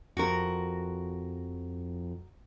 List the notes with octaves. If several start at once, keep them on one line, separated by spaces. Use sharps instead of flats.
F2 F#4 A#4